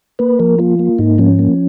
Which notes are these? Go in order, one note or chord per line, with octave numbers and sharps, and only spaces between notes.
A#3 B4
F3 A#4
A#3 F4
A#3
G#2 D#4
F3 C#4
A#3